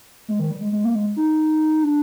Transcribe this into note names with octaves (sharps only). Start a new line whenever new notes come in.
G#3
D#3
G3
G#3
G#3
A#3
G#3
D#4
D4